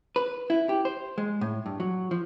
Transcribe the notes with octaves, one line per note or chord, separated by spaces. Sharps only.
B4
E4
G4
C5
G#3
A2
G2
F#3
F3